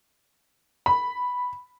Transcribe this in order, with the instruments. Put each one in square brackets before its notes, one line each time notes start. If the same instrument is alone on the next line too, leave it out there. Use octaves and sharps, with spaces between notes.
[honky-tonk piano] B5